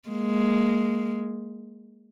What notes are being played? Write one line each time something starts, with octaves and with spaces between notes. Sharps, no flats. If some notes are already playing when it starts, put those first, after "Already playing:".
G#3 A#3